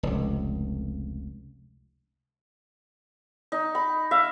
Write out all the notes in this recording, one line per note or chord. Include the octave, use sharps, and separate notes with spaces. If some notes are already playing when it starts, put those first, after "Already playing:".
F1 C#2
D#4
B5
E5 F5